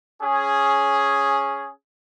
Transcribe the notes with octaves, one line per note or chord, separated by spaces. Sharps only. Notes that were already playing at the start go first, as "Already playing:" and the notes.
C#4 G#4